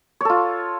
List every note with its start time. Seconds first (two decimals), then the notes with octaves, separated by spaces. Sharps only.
0.21 C#5
0.25 A4
0.30 F4